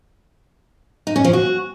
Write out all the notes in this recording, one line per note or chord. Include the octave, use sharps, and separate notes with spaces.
D#4
C#4
F3
F#4